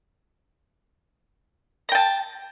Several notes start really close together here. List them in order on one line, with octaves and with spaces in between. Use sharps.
A#5 G5 A5